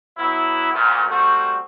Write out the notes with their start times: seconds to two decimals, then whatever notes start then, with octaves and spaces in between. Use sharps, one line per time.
0.17 F#3 B3 E4
0.72 D2 A#2
1.08 G3 A3 C4 F#4